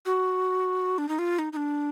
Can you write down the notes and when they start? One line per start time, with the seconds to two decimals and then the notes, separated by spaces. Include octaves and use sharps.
0.06 F#4
0.98 D4
1.08 D#4
1.19 F4
1.39 D#4
1.53 D#4
1.56 D4